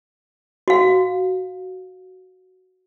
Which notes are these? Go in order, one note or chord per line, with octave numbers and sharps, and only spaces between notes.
F#4 F5